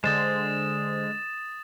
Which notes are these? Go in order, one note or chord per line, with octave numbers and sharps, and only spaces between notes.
D3 G#3 C5 D#6 A6 E7